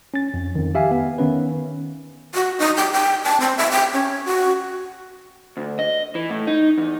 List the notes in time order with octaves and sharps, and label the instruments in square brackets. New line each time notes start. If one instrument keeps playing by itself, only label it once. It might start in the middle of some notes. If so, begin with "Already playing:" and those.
[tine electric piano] C#4 A6
F2
F2 D#3
G4 E5 F5 G#5
B3
D#3 B3 C#4 B4
[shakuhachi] F#4
D#4
G5
G5
A5
C4
E5
G5
C#4
F#4
[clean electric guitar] D2
D#5
E3
A2
D#4
E2